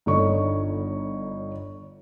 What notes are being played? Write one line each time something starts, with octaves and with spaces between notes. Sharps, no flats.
G1 D3 D#4 C#5 C#6